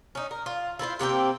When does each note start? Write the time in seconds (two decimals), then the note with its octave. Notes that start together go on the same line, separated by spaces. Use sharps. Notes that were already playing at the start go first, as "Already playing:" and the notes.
0.15 C#4 D#4
0.31 A#4
0.46 F4
0.79 E4 F4 A#4 C5
0.99 C3 A#3 C4 G5